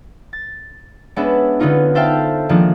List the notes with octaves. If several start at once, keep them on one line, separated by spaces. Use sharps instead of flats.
A6
G#3 B3 C#4 D4 B4 E5
D3 B3 C#4 D#4 F4
A4 C5 E5 F5 G5 A5
D#3 F3 G#3 A#3 D4